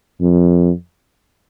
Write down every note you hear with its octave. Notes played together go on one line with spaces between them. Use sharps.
F2